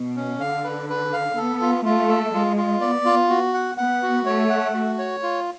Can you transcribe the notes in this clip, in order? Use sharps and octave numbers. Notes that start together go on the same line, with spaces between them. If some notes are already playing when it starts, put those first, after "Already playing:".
Already playing: B2
C#4
D3 F5
B4
B4
F5
B3 A4
F4
A3 F4
A4
G#3 F4
F4
B3 D5
F4
F#4
F#5
B3 F#5
F#4
A3 C#5
F#5
F#4
C#5
F4